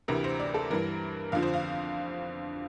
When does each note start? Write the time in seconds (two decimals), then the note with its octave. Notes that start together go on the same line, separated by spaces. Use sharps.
0.08 D2 C3 E3 A#4
0.24 C5
0.39 D5
0.54 A4
0.70 G2 E3 A#4
1.32 F2 D3 F3 F5
1.43 C5
1.54 F5